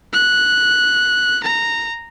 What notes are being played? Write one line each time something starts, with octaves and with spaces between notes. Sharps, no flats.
F#6
A#5